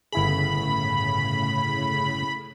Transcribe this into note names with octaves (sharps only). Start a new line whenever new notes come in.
G1 A2 C#3 E4 G#4 B5